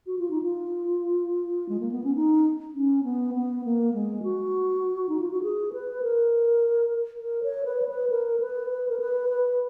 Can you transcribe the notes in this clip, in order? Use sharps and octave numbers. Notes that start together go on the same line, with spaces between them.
F#4
F4
D#4
F4
G#3
A#3
B3
C#4
D#4
C#4
B3
B3
A#3
G#3
F#4
D#4
F4
F#4
G#4
B4
A#4
A#4
C#5
B4
C#5
B4
A#4
B4
B4
A#4
B4
B4